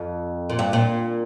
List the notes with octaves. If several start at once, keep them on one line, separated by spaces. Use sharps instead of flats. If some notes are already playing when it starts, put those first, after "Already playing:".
Already playing: F2
A#2
G2
A#2